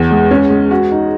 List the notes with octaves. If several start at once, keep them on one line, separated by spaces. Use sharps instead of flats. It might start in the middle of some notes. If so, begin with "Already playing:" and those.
Already playing: E2
G#3
C#4
G#3
F#4
D#4